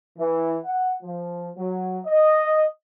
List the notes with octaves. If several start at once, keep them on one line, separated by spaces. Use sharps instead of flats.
E3
F#5
F3
F#3
D#5